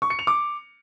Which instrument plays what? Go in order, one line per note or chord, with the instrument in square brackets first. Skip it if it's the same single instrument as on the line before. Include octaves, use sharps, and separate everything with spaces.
[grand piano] C#6
C#7
F7
D6